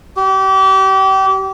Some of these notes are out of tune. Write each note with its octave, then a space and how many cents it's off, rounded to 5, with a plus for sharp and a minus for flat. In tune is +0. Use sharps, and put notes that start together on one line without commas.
G4 -30